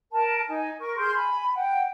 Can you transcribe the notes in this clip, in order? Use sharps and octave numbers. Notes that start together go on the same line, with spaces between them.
A#4 A5
D#4 G#5
A#4 C#6
G#4 C6 F6 G6
G#5 B5
F#5 G5